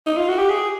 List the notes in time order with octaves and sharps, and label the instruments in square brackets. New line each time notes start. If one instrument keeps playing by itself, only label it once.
[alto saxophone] D#4
F4
F#4
G4
G#4